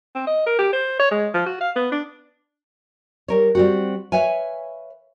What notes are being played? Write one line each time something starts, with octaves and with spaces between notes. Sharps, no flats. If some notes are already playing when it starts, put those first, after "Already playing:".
C4
D#5
A#4
G4
C5
C#5
G#3
F3
F#4
F5
B3
D4
G3 A#4 C#5
G3 C4 F#4
B4 C#5 E5 F5 G#5